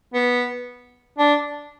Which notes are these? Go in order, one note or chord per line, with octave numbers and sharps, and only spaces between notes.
B3
D4